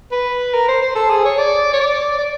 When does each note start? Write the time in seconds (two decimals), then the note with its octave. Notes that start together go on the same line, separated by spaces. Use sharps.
0.12 B4
0.54 A#4
0.68 C5
0.81 C5
0.95 A4
1.10 G#4
1.25 C#5
1.38 D5
1.73 C#5
1.80 D5
2.18 D5